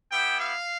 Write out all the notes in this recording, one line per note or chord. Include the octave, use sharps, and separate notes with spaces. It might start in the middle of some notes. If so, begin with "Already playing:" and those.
B3 E4 G4 G5
F5